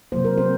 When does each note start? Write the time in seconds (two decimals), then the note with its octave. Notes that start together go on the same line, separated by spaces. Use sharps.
0.12 C3 F#3 A#3 C5
0.25 A#4
0.37 C4 C5